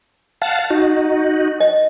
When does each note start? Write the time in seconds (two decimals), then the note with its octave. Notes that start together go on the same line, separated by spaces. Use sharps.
0.42 F5 F#5 A5
0.70 D#4 F#4
1.60 D#5